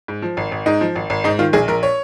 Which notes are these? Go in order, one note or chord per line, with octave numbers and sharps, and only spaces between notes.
G#2
F3
G#1
G#1
G#2 D#4
F3
G#1
G#1
G#2 D#4
D#3 F4
A#1 G#4
A#1 A#4
C#5